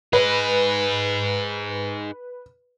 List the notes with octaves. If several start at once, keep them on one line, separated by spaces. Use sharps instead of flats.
D#4 G#4 B4